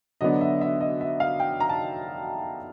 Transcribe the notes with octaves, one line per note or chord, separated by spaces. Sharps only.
D3 F#3 B3 D4 D#5
E5
E5
D#5
E5
F5
G5
A#5
A5